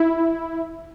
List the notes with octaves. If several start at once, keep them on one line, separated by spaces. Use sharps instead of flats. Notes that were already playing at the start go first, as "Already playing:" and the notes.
Already playing: E4